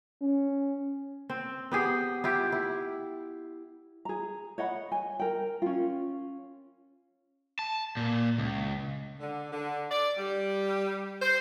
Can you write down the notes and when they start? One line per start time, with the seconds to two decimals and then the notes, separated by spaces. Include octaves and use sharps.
0.22 C#4
1.30 C4
1.72 B3 G4 G#4
2.24 E4 F4 G4
2.52 E4
4.05 G#4 A#5
4.58 C#5 D#5 F#5 B5
4.92 G#5
5.19 A#4 G5
5.62 C#4 F4
7.59 A5
7.97 A#2
8.38 C#2
9.20 D3
9.52 D3
9.90 D5
10.17 G3
11.20 C5